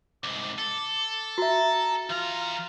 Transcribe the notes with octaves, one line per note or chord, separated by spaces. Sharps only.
C2 G#2 D6
A4
F#4 E5 A#5
E3 F4 A#5